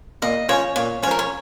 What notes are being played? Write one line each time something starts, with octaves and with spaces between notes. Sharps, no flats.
A#2 D#5
F3 C#4 C#5
A#2 C#5
F3 C#4 A#4 C#5
C#5